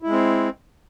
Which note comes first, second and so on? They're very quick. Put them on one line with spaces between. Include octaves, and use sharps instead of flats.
E4 G#3 C4